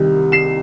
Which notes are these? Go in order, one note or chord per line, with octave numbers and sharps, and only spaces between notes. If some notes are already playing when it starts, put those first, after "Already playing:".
Already playing: C2 C3 D#3 G3
C7 E7